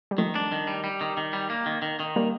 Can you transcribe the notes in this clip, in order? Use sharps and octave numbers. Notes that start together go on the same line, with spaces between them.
G3
D#3 F3 A3
D4
D#3
G3
G3
D#3
D#3
G3
A#3
D#3
D#3
D#3
G3 A#3